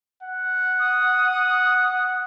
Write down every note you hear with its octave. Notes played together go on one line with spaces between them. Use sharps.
F#5
D#6